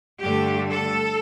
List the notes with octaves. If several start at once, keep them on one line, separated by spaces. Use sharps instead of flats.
G2 D3 A3 G4
A4